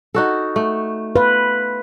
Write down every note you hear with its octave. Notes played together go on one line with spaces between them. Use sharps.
D#4 F#4 A4
A3
F4 B4